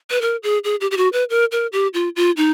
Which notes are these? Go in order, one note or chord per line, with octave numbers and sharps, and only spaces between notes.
B4
A#4
G#4
G#4
G4
G4
F#4
B4
A#4
A#4
G4
F4
F4
D#4